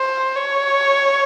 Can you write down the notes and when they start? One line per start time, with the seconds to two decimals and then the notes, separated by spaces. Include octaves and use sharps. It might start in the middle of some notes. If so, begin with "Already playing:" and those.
Already playing: C5
0.35 C#5